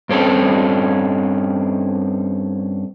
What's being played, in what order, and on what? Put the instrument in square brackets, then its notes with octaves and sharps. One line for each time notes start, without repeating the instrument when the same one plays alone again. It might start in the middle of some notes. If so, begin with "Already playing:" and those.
[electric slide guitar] G2 C4 C#4 A4